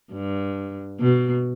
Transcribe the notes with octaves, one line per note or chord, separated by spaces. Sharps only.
G2
B2